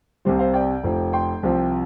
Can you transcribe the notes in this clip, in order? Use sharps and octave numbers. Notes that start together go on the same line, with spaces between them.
C2 C3 G3 G4 C5
C5 F5
D5 G5
F1 F2 F3
G5 C6
C2 C3 F3